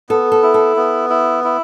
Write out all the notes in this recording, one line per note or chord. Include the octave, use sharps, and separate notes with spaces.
B3 A4
A4
E4
A4
B3
E4
E4